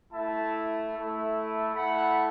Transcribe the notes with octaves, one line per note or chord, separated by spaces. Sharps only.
A3 E4 E5 A5
A3 E4
A3 E4 F#5 B5